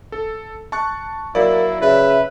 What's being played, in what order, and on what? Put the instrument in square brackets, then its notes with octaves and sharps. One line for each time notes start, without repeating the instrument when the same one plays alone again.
[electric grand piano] A4
A5 C#6 F#6
[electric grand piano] F#3 D5 [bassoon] A#3 [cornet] E4
[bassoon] C#3 [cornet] B4 [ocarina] E5